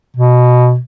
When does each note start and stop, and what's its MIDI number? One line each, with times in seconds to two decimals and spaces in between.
0.17 0.78 47